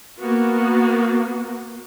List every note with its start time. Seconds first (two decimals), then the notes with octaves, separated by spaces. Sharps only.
0.21 A#3 B3 F#4